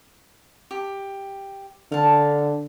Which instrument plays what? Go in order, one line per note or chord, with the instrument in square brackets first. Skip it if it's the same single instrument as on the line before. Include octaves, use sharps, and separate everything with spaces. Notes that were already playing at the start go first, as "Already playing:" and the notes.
[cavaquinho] G4
[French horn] D3 [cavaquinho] F5 A5